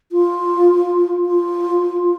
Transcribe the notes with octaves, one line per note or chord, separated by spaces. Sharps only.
F4
F4